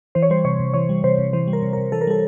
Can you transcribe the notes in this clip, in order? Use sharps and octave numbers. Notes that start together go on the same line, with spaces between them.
E3 C5
C#5
G3 C5
C3 C#5
C3
E3 C#5
G3
C3 C5
C3
E3 C5
G3
A#4
C3
C3 A#4
E3 A4
A#4
G3 A4